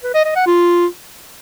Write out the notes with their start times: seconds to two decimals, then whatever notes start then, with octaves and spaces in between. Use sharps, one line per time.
0.04 B4
0.14 D#5
0.25 D#5
0.36 F#5
0.47 F4